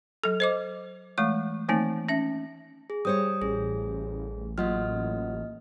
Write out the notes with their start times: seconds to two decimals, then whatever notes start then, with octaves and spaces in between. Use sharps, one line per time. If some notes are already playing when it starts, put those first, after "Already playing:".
0.24 F#3 A4
0.40 C5 D#5 D6
1.18 E3 G#3 A3 C#6
1.69 D#3 E3 A3 A#3 C4 D#4
2.09 C#4 E5
2.90 G#4
3.05 G3 C5 C#5 D#6
3.42 A1 G#4
4.58 F#3 A#3 F4 D#5 F6